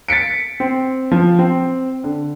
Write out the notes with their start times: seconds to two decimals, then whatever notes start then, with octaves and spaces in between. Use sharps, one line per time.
0.09 A6 B6 C#7 D7
0.60 C4
1.12 F3
1.39 C4
2.04 D3